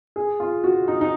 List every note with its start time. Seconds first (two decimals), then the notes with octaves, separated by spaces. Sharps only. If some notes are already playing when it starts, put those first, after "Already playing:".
0.16 G#4
0.40 F4
0.64 F#4
0.88 D#4
1.01 D#4